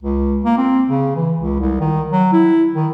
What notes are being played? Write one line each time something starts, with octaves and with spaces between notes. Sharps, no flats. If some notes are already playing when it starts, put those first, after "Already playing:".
C#2
A#3
C4
C#3
E3
C#2
C2
D#3
F#3
E4
D#3